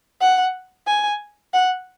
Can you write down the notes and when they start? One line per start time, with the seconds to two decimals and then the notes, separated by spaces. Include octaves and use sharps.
0.21 F#5
0.87 G#5
1.54 F#5